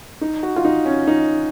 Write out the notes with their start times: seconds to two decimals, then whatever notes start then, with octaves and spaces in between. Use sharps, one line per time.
0.21 D#4
0.43 F#4
0.56 F4
0.65 D#4
0.86 C#4
1.07 D#4